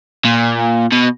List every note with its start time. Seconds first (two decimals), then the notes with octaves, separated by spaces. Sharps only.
0.25 A#2
0.92 B2